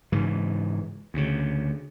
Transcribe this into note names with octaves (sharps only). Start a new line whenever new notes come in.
G#2 C#3 E3
D2 C#3